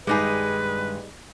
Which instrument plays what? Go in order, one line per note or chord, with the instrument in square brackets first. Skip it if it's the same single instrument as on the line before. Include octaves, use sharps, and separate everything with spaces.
[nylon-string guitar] G2 D#3 G#3 [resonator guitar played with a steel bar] G3 D#4 G#4 [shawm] B4